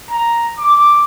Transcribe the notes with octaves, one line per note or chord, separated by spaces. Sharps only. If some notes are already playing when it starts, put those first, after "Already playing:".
A#5
D6